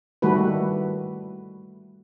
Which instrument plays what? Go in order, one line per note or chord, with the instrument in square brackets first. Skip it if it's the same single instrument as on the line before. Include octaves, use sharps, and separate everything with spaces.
[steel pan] D#3 G3 A3 F#4 B4